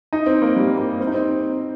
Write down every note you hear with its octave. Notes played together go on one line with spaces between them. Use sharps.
D#4
C4
A#3
G3
A#3
C4
D#4
C4